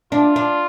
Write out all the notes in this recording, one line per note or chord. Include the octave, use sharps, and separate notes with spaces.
D4 F4
D4